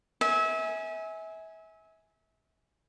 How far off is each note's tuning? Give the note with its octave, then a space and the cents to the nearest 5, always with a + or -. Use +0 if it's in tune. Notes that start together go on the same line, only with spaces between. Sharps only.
E5 -30 G#5 +0